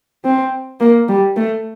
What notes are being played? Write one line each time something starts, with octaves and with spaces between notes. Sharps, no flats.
C4
A#3
G3
A3